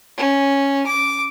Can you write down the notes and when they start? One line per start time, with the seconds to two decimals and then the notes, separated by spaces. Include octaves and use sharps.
0.17 C#4
0.87 D6